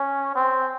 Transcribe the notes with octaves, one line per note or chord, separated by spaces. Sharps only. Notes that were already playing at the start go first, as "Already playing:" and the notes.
Already playing: C#4
C4